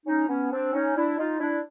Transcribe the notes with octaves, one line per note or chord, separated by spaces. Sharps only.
C#4 D#4
B3 C#4
C4 D4
C#4 D#4
D4 E4
D#4 F4
D4 E4